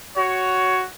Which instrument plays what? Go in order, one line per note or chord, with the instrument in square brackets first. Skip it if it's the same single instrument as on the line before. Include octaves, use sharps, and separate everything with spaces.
[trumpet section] F#4 C#5